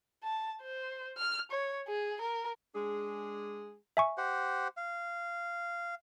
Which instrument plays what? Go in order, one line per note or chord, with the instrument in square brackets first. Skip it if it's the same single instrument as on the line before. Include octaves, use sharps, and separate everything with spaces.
[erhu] A5
C5
F6
C#5
G#4
A#4
[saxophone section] G#3 D4 G#4
[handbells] E5 G#5 C#6
[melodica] G4 C5 F#5
F5